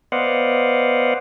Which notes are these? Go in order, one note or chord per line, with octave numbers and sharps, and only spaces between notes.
B3 C5 D5 D#5 F5 F#5